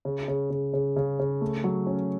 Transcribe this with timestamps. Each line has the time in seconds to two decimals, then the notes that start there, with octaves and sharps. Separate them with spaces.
0.05 C#3
0.28 C#3
0.50 C#3
0.74 C#3
0.96 C#3
1.20 C#3
1.41 A3
1.64 F#3
1.87 C#4